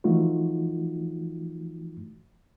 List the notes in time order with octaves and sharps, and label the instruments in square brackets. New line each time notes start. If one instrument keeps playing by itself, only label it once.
[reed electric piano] E3 F3 A3 D#4 F4 F#4